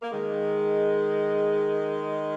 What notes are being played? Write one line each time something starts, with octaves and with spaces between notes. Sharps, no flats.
A#3
D#3 G#3